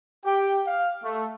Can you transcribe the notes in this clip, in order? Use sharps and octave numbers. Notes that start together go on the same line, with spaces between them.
G4 G5
F5
A3